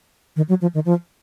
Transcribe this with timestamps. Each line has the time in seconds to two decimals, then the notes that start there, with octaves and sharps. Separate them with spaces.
0.36 D#3
0.49 F#3
0.62 F3
0.74 D#3
0.86 F3